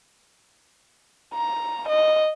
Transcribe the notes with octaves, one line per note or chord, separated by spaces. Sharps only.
A#5
D#5